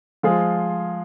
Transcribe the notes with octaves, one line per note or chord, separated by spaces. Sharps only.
F3 G#3 F4 G#4